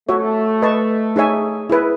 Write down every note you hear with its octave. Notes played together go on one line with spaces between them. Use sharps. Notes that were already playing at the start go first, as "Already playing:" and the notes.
A3 F#4 C#5 E5
B4 D#5 A5 C#6
D#4 G#4 C#5 E5 G#5
E4 G#4 B4 E5